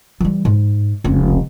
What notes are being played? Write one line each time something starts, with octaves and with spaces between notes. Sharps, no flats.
E3 G3
G#2
F1 C#2